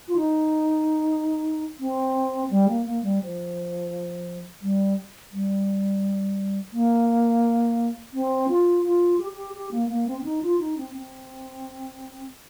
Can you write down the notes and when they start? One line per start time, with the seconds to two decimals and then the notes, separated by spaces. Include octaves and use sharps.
0.08 F4
0.16 D#4
1.80 C4
2.50 G3
2.68 A#3
2.86 A#3
3.03 G3
3.21 F3
4.62 G3
5.32 G3
6.73 A#3
8.13 C4
8.49 F4
8.83 F4
9.19 G4
9.33 G4
9.54 G4
9.71 A#3
9.89 A#3
10.07 C4
10.19 C4
10.24 D#4
10.42 F4
10.59 D#4
10.77 C4
10.95 C4